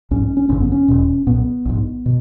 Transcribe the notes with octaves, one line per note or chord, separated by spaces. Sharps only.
A#1 G#2 C#4
C#4
C#4
G#1 F#2 C#3 C#4
B3
C#4
E1 E2 B2
B1 A#2 B3
A#1 G#2
B2